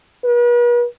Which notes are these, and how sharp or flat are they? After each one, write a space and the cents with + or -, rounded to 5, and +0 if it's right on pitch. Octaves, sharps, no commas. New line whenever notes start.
B4 -45